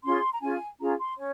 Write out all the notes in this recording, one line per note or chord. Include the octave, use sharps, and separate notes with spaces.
C#4 F4 G#4 C6
A#5
C#4 F4 G#4 G#5
C#4 F4 G#4 A#5
C6
C#4 C#5